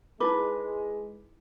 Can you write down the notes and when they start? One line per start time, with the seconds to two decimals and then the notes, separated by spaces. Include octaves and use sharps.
0.20 G#3 D#4 E4 B4 D6